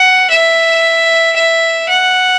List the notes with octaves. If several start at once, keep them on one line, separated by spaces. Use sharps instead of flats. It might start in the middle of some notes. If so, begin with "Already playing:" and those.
Already playing: F#5
E5
E5
F#5